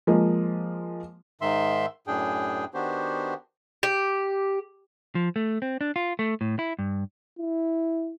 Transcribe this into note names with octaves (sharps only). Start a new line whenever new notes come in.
F3 G#3 A#3
G#2 D#3 E5 C6
F#2 A2 D4 G#4 G5
D#3 B3 D4 F#4 G4 C5
G4
F3
A3
C4
D4
F4
A3
A2
E4
G2
E4